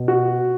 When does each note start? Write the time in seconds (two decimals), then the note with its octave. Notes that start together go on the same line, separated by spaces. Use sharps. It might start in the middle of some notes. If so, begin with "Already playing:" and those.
Already playing: B2
0.08 F#4